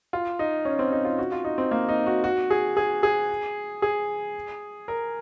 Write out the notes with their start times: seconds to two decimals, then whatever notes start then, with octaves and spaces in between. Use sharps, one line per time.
0.13 F4
0.39 D#4
0.65 C#4
0.79 C4
0.92 D#4
1.05 F4
1.18 F#4
1.32 F4
1.45 D#4
1.58 C4
1.71 A#3
1.89 D#4
2.06 F#4
2.24 F#4
2.50 G#4
2.77 G#4
3.03 G#4
3.82 G#4
4.88 A#4